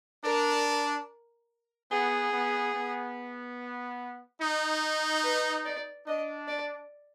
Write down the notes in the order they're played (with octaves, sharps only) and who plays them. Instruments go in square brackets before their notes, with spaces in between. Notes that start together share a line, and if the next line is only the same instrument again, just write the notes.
[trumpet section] D4 [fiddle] A#4
[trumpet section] B3 [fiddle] G#4
[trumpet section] B3
B3
D#4
[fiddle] B4
D5
[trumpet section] D4 [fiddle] D#5
[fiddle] D5